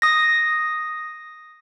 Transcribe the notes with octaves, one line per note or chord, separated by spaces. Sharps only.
D#6 A#6